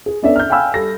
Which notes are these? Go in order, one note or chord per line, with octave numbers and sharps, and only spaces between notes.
G#4
B3 C#4 D4 A4 E5
F6 G6
F5 G5 G#5 B5 E6 F6
G3 A4 A#6